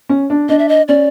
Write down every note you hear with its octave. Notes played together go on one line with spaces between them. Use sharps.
C#4
D4
D4 D#5
E5
D#5
C#4 D5